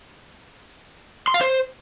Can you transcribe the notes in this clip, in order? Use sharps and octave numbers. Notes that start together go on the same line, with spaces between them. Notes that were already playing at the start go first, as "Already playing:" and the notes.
C6
F5
C5